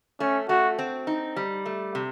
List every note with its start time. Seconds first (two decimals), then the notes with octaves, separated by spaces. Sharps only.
0.20 A3 C#4
0.49 A3 F#4
0.79 C4
1.07 D#4
1.36 G3
1.66 A3
1.95 C3